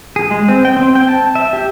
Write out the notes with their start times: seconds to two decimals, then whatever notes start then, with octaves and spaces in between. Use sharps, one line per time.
0.16 G#4
0.31 G#3
0.48 C4
0.65 G5
0.77 C4
0.95 G5
1.08 A5
1.35 E5
1.53 G4